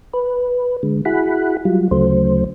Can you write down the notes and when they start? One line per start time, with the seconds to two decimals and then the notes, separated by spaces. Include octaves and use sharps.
0.14 B4
0.83 D3 G#3
1.05 E4 F#4 G#4 F#5 B5
1.65 F#3 G3 F4
1.91 D2 C#3 F#3 A3 C5